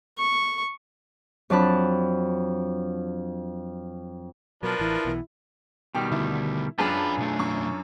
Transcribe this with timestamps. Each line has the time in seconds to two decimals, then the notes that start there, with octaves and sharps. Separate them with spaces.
0.18 C#6
1.50 F2 F#3 D4 A5 B5 F#6
4.63 B2 F3 F#3 D4 A#4 B4
4.80 A1 E3 E4
5.05 B1 B2 E3
5.95 B2 D#3 G3 G5
6.12 D3 A3 E4
6.78 F#2 D4 F4 G#4 B4 G5 A5 B5
7.18 B1 A3
7.39 F#2 C#6